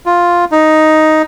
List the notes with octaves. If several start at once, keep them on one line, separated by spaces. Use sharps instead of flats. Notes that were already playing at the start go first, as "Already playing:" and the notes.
F4
D#4